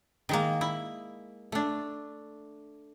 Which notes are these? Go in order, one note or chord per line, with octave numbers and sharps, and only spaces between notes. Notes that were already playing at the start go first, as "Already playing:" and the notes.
D#3 G#3 A#3
E4
A3 D4